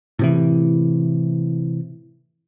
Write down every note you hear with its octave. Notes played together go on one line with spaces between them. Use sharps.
A2 C3 E3